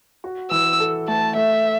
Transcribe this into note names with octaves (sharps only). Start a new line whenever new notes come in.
F#4
E3 E6
A4
A3 A5
A3 E5